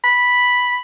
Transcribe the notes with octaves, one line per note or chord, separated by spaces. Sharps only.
B5